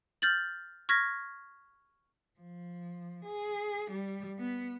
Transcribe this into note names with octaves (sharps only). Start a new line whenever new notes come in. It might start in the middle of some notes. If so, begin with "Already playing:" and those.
F6 G6 A6 F#7
C#6 F6 G#6 A#6 B6
F3
G#4
G3
B3